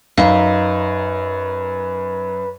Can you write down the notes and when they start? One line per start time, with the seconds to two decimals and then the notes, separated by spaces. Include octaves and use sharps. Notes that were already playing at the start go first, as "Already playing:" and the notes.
0.18 F#2 D#4 B4 E5 F5